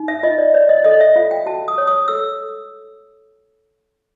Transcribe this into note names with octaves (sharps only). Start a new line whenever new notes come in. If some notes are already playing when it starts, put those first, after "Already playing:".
Already playing: D#4
E5
F4 D#5
D5
C#5 D5
D#5
A4 D#5
E5
F4 F5
G5
F#4 A5
D#6
C#5
D#6
A4 E6